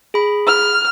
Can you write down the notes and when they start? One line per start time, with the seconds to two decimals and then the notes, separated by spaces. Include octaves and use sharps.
0.14 G#4 B5
0.47 F6